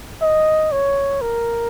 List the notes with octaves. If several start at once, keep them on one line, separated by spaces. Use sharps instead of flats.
D#5
C#5
A#4